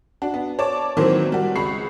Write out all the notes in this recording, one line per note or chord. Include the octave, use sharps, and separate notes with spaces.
D4 F#4
B3
C#5 D5 A5 D6
D#3 E3 F#3 A#3 C4 C5
G3 F#4
C#2 B5 C#6 C7